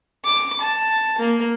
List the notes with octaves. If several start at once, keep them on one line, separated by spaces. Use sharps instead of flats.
D6
A5
A#3